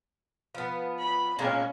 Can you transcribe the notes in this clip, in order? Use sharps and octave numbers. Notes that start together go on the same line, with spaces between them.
F3 B3
B5
A#2 G#3 A#3 C#4